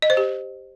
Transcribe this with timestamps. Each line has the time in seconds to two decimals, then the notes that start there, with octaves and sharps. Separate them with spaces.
0.02 D#5
0.10 C5
0.17 G4